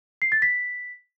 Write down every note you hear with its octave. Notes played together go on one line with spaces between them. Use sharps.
C7
A6
B6